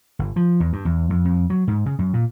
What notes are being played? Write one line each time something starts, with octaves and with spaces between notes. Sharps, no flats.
G1
F3
E2
G2
E2
F2
F2
F#3
G#2
C#3
F#2
A#2